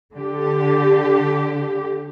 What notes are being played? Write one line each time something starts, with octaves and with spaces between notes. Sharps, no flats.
D3 G4